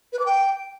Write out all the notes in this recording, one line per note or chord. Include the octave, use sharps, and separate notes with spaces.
B4
D6
G5